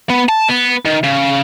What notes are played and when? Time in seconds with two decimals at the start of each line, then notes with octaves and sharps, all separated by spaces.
0.10 B3
0.29 A5
0.49 B3
0.85 D#3
1.03 C#3